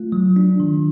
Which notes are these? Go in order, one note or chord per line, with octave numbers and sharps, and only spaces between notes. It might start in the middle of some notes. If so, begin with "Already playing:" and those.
Already playing: A3 F4
F#3
D4
D#3